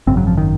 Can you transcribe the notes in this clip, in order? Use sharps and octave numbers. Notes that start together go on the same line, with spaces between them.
G#1 F#2 C#3 C4
F#3
F3
D#3